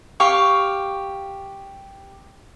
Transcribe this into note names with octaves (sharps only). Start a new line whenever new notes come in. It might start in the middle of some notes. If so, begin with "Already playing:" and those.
G4 F5 C#6